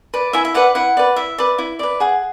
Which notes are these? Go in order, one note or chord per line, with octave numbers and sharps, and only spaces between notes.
B4 D5
E4 E5 G#5
E5
B4 D5 F#5
E4 F#5
B4 D5
E4 E5
B4 D5
E4
B4 D5
G#4 F#5